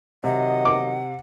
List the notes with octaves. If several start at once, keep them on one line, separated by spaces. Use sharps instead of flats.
C3 D#3 F#3 D#5 F#5
D6